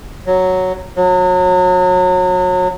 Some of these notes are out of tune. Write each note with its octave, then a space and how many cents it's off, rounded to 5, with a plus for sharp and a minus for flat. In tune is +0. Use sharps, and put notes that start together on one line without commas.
F#3 +0
F#3 -30